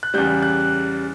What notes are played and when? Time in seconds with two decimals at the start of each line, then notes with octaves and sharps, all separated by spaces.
0.03 F#6
0.14 E2 C#3 G3 G6
0.43 F#6